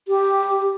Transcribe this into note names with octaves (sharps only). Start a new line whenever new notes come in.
G4